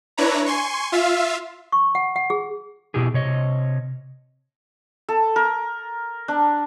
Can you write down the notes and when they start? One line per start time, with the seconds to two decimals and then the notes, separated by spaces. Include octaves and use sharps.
0.17 D4 E4 B4 C#5 A#5
0.46 G#5 C6 C#6
0.92 F4 E5 F5
1.72 C#6
1.95 F#5
2.16 F#5
2.30 G#4
2.94 B2 E4 G4 G#4
3.14 C3 C#5 D#5
5.09 A4
5.36 A#4
6.28 D4